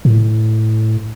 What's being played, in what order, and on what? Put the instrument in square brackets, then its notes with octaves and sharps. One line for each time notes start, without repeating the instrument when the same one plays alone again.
[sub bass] A2